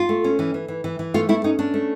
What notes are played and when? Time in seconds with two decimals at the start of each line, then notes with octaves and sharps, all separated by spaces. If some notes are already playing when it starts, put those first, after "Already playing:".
Already playing: F4
0.09 A3
0.24 C#4
0.39 E3
0.54 E3
0.68 E3
0.84 E3
0.99 E3
1.14 A3 F4
1.29 A3 E4
1.44 C#4 D#4
1.59 C#4 D4
1.74 A3